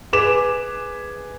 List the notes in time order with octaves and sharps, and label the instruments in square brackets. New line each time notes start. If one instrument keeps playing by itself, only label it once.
[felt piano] G#4 B4 D6 E7